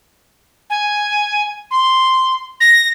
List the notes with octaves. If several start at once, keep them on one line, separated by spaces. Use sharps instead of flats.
G#5
C6
A#6